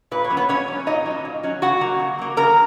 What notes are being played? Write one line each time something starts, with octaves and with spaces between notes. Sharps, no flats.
A#2 B4
C#5
F#3 C#4
B3 B4
A#2 C#4 C#5
F#3 C#4
A#2 D#4 D#5
F#3 C#4
A#2
F#3 C#4
C#3 F#4 F#5
F#3 A#3
C#3
F#3 A#3
C#3 A#4 A#5